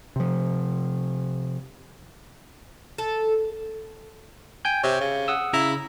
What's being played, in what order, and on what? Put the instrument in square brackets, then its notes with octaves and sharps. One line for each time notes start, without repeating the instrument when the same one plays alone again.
[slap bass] C3 F3
[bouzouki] A4
[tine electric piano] G5 G#5 G6
[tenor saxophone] C3 [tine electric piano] C#5
[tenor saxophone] C#3
[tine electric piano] F#5 D#6 E6
[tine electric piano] C#3 A#5 E6 [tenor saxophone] E4